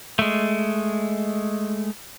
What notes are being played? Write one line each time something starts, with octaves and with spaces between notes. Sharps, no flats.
G#3 A3